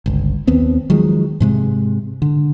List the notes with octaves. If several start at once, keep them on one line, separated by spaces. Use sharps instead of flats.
G1 C#2
D#2 B3 C4
D#3 F3 F#3 G#3
G#2 C3 G#3
D3